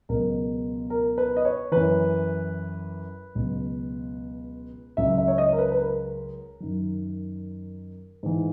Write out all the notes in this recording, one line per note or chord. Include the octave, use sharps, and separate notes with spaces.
C#2 B2 F#3 A#4
A#4
B4
D#5
C#5
F#2 E3 B4
C#2 B2 F#3
C#2 C#3 F#3 E5
E5
C#5
D#5
A#4
B4
B4
A#4
F#2 D#3 F#3
G#2 E3